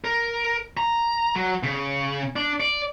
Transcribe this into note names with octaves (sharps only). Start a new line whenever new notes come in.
A#4
A#5
F#3
C#3
D4
D5